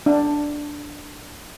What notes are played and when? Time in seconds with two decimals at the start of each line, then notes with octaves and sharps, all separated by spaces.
0.06 D4